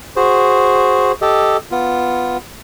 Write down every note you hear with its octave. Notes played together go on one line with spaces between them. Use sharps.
F#4 G#4 C5
G4 A4 D#5
B3 F4